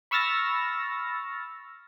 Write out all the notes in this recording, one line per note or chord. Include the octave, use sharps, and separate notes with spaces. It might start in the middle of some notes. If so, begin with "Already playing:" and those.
B5 C#6 E6 F6 A6 A#6